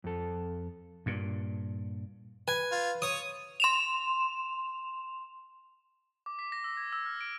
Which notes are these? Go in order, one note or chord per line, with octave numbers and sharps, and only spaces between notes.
F2 A4
G2 A#2
B4 G#5
F4
C#5 D#6
C6 E7 F7
D6
B6
A#6
E6
G#6
E6
F6
D7